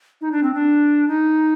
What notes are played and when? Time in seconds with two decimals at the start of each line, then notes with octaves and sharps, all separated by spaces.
0.21 D#4
0.32 D4
0.43 C4
0.54 D4
1.08 D#4